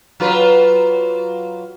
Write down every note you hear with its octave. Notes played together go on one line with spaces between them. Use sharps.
F#3 F4 B4